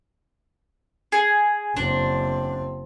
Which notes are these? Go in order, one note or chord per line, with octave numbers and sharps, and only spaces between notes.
G#4
F#1 C4 D4